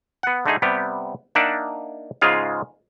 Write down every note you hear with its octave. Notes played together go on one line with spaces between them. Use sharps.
B3 F#5
D3 A3 D#4 G#4
C3 G3 B3 G4
A#3 D4 D#4 D5 E5 F#5
G#2 C#3 G#3 F4 G#4 F5